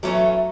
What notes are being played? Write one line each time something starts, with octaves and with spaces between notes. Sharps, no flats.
E3 F#3 A3 C#4